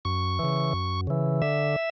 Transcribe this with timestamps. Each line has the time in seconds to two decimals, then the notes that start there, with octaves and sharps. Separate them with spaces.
0.05 F#2 C#6
0.39 C#3 E3
0.73 F#2
1.07 C#3 E3
1.42 D3 E5